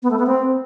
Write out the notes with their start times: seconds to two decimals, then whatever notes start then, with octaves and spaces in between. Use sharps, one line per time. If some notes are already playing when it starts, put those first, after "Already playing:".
0.03 B3
0.11 A3
0.19 B3
0.26 C4